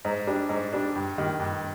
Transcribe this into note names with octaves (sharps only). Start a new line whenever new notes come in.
G#2
G3 D4
G#2
G3 D4
G2
D#3 G3
G2